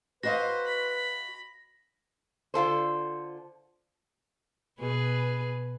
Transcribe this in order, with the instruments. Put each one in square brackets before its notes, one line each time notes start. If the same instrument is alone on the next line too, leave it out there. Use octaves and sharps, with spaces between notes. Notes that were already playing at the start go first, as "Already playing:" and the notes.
[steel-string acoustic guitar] F#4 D#5 F5 [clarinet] B4 [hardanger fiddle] C5 [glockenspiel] A#6
[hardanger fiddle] B5
[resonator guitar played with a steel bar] D3 F4 A4 C5
[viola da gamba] B2 G#4 B4